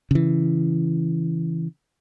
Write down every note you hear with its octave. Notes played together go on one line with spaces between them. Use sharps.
C#3 E3